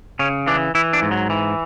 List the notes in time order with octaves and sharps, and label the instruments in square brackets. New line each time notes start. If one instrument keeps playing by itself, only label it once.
[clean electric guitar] C#3 C#4
E3 D4
E3 E4
D4
G#2
F#3
E3